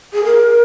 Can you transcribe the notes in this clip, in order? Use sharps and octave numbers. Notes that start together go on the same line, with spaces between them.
G#4
A#4